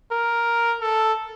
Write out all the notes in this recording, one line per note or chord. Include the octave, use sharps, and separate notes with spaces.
A#4
A4